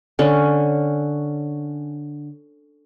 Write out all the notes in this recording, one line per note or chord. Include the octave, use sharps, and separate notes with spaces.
D3 C#4